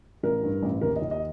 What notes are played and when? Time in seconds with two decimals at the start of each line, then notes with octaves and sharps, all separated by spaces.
0.23 A1 A#4
0.43 G2
0.63 A1
0.81 D#2 A#4
0.96 D#5
1.01 D#2
1.11 D#5